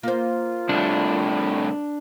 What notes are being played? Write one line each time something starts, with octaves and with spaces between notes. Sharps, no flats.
A#3 F4 C5
C2 A2 D4